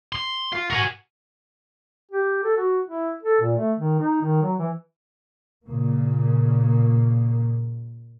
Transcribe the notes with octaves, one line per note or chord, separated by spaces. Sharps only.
C6
F4
F#4 A#4 G#5
G4
A4
F#4
E4
A4
A#2
A3
D#3
D#4
D#3
F#3
E3
A#2 C#3 A#3